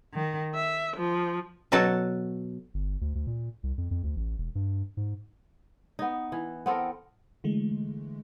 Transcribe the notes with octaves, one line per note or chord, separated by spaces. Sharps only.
D#3
E5
F3
B2 F#3 F#4 A4 C#5 A5
G1
D2
D2
A#2
C2
F2
F2
D2
A1
E1
G2
G#2
B3 D#4
E3
B3 C4 A4 A#4
D3 E3 G#3 A3